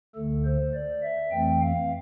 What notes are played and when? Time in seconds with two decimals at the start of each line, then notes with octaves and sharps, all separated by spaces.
0.15 D2 D3 A3 A4
0.45 C5
0.74 D5
1.03 E5
1.32 F2 E3 A3 C4 G5
1.61 F5